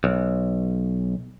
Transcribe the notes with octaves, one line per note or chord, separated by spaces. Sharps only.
B1